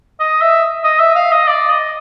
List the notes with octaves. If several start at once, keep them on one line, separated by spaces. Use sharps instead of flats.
D#5
E5
D#5
E5
F5
D#5
D5
D#5